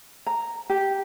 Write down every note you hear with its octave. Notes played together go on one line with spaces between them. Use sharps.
A#5
G4